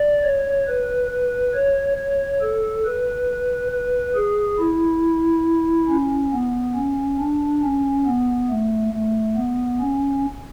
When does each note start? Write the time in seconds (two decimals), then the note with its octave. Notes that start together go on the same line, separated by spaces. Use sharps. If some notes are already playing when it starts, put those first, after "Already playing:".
Already playing: D5
0.24 C#5
0.68 B4
1.11 B4
1.54 C#5
1.98 C#5
2.41 A4
2.85 B4
3.72 B4
4.15 G#4
4.59 E4
5.89 C#4
6.33 B3
6.75 C#4
7.20 D4
7.63 C#4
8.06 B3
8.50 A3
8.93 A3
9.36 B3
9.80 C#4